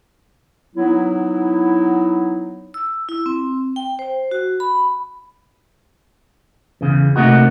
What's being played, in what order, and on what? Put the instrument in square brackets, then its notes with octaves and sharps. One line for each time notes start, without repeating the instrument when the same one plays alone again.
[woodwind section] F#3 B3 D#4 E4
[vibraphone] E6
E4
C4
G5
C5
F#4
B5
[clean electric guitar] E2 C#3
C3 E3 A3 A#3 D#4 F#4